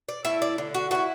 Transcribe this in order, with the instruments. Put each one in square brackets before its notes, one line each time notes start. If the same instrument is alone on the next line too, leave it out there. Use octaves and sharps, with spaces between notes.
[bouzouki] D5
A3 E4 E5
D5
D3
F#4
A3 F#4
E4